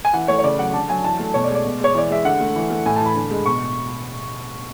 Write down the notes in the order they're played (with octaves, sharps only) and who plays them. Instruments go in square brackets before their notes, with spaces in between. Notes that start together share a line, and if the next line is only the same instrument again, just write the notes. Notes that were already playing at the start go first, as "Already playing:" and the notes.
[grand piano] G#5
E3 F#5
A3 C#5
C#5
C#3 D5
F#3 F#5
D3 A5
F#3 G#5
E3 A5
A3
B2 C#5
D5
G#3
D5
B2
G#3 C#5
E3 D5
G#3 E5
D3 F#5
A3
E3
A3
A2 G#5
A5
E3
B5
D3
G#3
B2 C#6